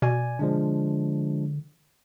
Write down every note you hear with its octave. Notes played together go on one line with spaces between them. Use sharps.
B2 D5 G#5
D3 F3 G#3 D4